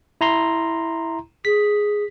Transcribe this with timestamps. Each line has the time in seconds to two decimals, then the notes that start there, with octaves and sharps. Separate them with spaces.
0.21 E4 A#5 C6
1.45 G#4 B6